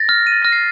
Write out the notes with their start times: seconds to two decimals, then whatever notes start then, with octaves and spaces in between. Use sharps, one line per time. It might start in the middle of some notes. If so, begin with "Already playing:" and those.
Already playing: A6 A#6
0.09 F6
0.27 D#7
0.32 A6
0.42 F6 A#6
0.52 C7